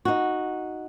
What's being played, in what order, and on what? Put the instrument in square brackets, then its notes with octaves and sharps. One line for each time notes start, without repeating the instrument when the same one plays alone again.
[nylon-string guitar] D#4 F#4